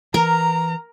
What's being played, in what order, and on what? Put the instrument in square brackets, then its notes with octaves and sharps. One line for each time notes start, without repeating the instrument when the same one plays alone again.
[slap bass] E3 [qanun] A#4 [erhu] A#5